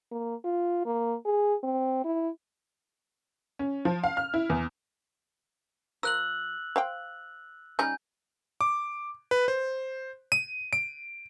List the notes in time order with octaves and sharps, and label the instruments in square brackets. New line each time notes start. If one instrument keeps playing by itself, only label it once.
[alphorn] A#3
F4
A#3
G#4
C4
E4
[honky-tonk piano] C#4
F3
F5
F6
E4
E2
[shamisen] F3 A#4 [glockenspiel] E6 F#6 F#7
[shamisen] C5 F5 G5
[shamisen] G3 C#4 D#4 [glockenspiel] G#5 G6
[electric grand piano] D6
B4
C5
D#7
D7